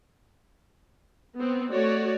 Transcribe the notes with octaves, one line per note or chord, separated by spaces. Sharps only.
B3 C4
A3 F#4 C#5 D5